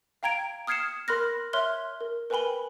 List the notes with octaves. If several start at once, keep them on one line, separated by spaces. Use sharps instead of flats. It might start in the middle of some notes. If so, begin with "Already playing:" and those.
F5 G5 A#5 G#6 D7
D#6 F6 G#6 C7 C#7 E7
A#4 B5 C6 F6 F#6 A#6
C#5 E5 C6 F6 F#6 G7
A#4
A#4 B4 G5 G#5 B5 G7